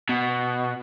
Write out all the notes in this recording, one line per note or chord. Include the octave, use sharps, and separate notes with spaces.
B2